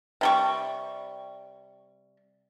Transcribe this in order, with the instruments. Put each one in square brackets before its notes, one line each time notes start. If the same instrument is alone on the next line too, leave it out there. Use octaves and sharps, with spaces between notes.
[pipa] C3 G3 C#6